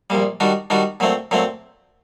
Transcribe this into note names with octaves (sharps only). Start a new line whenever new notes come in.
A#1 A#2 G3
D#3 G3 D4 F#4
D#3 G3 D4 F#4
A#2 F#3 A3 C4
A#2 F#3 A3 C4